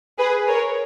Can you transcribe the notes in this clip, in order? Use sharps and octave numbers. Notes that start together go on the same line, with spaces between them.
G#4 B4
A#4 C#5